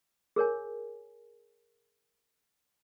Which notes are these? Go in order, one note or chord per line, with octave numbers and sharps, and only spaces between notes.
G#4 A#4 C#5 G#5